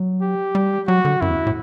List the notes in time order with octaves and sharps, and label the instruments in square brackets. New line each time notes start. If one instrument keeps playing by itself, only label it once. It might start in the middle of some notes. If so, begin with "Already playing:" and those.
Already playing: [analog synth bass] F#3
[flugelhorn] G4
[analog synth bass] G3
[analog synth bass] F#3 [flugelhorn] F#4
[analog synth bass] D3
[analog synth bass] F#2 [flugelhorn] E4
[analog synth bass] E2
A2